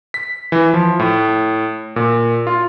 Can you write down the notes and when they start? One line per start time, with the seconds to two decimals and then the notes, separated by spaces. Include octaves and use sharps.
0.14 B6
0.52 E3
0.74 F3
0.99 A2
1.96 A#2
2.47 F4